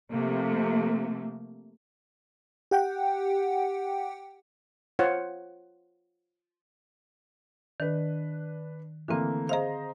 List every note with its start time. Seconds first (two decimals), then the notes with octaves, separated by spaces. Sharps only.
0.12 C3 F3 A3 A#3
2.71 G4 F#5 G5
4.99 F4 C5 C#5 F#5
7.80 D#3 D4 B4
9.08 D3 E3 A3 A#3 C4
9.49 G#4 C5 D#5 F5 A#5